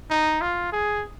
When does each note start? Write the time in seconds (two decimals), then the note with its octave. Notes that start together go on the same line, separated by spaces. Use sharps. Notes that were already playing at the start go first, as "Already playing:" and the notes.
0.10 D#4
0.42 F4
0.72 G#4